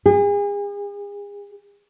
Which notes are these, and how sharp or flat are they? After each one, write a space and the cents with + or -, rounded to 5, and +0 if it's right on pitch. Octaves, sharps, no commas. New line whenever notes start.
G#4 -40